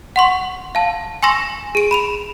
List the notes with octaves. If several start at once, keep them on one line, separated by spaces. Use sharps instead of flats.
F#5 C6 C#6
F5 A5
G#5 C6 C#6 E6 A#6 E7
G#4 D7
B5 E7 F7